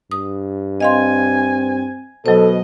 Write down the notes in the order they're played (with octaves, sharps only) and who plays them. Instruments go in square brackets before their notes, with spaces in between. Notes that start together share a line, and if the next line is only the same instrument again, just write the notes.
[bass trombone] G2 [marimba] D#6
[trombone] C4 [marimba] D#5 F5 C6 [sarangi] G#5
[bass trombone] B2 [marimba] F#3 C5 [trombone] A4 [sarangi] D#5